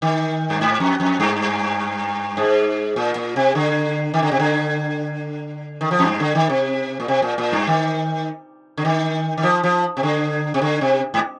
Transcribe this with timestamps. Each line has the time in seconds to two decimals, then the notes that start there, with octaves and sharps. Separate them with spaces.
0.02 D#3
0.50 G2
0.61 G#2
0.80 F2
1.00 F2
1.20 G2
2.37 G#2
2.96 A#2
3.16 A#2
3.36 C3
3.55 D3
4.14 D#3
4.22 D3
4.32 C3
4.39 D3
5.81 D#3
5.91 F3
5.99 F2
6.05 G2
6.20 D3
6.35 D#3
6.50 C3
7.00 A#2
7.08 C3
7.22 A#2
7.38 A#2
7.52 G2
7.67 D#3
8.77 D3
8.85 D#3
9.38 D#3
9.43 F3
9.63 F3
9.97 C3
10.03 D3
10.54 C3
10.62 D3
10.81 C3
11.14 G#2